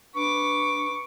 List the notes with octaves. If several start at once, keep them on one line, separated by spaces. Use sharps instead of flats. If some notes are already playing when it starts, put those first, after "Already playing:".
D4 B4 C#6 D6